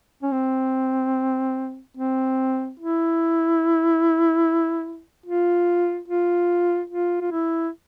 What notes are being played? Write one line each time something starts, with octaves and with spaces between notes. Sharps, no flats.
C#4
C4
C4
E4
F4
F4
F4
F4
E4